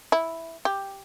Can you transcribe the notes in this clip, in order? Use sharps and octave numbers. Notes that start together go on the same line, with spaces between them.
E4
G4